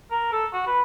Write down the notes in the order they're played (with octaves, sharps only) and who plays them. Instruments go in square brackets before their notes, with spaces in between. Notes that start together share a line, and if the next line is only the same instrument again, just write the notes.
[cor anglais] A#4
A4
F#4
B4